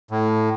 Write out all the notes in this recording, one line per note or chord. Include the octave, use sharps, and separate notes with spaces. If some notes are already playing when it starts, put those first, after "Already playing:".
A2